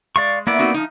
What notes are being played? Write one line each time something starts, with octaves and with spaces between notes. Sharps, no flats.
G#3 D5 F5 C#6
A#3 B3 E4 D5
C4 D#4 F#4
F3 D#4